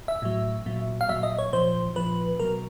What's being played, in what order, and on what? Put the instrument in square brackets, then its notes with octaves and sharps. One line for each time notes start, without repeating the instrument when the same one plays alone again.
[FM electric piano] E5
A2 F#3
A#2 F#3
F5
A#2 F#3 E5
D#5
C#5
A#2 F3 C5
A#2 F3 B4
B2 F#3 A#4